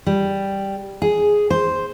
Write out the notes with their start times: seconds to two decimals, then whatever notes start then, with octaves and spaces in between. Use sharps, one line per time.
0.06 G3
1.02 G#4
1.50 C5